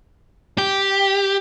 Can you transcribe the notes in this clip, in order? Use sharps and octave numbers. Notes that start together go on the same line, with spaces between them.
G4